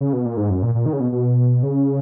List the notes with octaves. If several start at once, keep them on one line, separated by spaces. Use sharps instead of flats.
C#3
B2
A#2
G#2
F#2
A#2
A#2
D#3
C#3
B2
B2
C#3